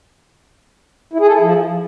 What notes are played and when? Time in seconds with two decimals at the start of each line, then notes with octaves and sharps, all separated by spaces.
1.13 E4
1.20 G#4
1.27 A4
1.34 E4
1.41 F3